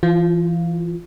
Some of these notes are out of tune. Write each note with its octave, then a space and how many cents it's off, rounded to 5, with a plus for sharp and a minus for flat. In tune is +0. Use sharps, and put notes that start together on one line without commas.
E3 +30 F4 +0